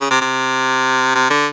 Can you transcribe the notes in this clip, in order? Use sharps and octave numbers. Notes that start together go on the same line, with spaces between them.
C#3
C3
C3
C3
D3